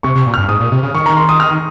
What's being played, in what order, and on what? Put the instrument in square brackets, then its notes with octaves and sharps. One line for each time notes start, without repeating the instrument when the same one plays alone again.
[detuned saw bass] C3 [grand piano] C#6
[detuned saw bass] C3
A#2
[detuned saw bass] G2 [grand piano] F6
[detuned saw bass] G#2 [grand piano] D#6
[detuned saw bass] A#2
C3
C#3
[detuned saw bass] D#3 [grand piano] C#6
[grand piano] A#5
C6
D#6
F6